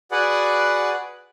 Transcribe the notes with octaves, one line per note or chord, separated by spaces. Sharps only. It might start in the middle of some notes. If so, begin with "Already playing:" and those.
F#4 G#4 B4 D5 F#5